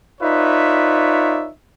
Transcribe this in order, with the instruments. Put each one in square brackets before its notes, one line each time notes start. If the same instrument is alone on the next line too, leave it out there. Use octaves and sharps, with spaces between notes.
[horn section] D#4 F4 B4 C#5 D5 E5